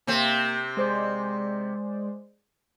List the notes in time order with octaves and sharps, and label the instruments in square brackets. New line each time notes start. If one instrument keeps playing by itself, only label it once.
[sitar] C3 C4 [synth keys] A#3
[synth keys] G#3 C5 D5